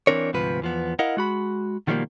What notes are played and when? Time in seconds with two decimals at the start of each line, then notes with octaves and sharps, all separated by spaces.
0.07 E3 G3 C4 D4 A#4 C#5
0.33 D2 G#2 C3 F3 B4
0.61 E2 F3 B3
0.99 E4 A#4 D#5 F5 F#5
1.17 G#3 F#4 B5
1.87 B2 D#3 F3 G3 A3 A#3